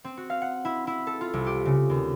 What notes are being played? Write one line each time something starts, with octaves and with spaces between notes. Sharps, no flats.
C4
F#4
F5
F#5
E4
E4
A4
F4
C2
G4
C#3
D#2